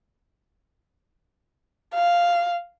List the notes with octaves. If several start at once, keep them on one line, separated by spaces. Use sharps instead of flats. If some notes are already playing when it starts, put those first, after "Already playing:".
F5